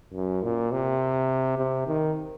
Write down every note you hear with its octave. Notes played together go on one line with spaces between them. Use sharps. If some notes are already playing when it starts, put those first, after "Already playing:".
F#2
A#2
C3
C3
D#3